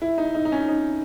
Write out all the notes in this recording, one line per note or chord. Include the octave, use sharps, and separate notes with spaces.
E4
D#4
D#4
D#4
C#4
D#4